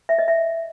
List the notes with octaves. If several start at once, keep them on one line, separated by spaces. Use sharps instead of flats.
E5
D#5
E5